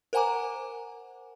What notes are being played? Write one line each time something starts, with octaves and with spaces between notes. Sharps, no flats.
A#4 C5 F#5 G#5 A#5 D6